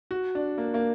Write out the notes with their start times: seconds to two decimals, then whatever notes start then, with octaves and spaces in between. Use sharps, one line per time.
0.11 F#4
0.35 D4
0.58 A#3
0.74 A#3